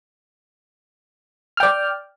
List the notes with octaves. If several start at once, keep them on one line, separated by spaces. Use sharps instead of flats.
D5 G5 F6